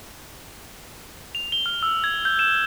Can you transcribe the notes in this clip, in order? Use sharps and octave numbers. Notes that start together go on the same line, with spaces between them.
F7
G7
F6
E6
G#6
G6
E7